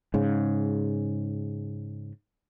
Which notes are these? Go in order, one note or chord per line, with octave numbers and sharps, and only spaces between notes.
G#2 C#3